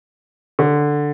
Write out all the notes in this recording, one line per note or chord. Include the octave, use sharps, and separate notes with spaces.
D3